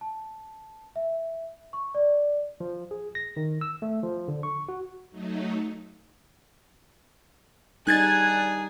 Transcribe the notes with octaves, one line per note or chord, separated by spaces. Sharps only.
A5
E5
C#6
D5
F3
G#4
A#6
D#3
E6
A3
F3
D3
C#6
F#4
F#3 A3 D#4
G3 D4 D#4 G#4 F#6 G#6 A6